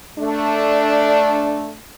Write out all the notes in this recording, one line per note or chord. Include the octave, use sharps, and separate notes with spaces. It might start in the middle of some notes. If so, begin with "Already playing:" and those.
A3 D4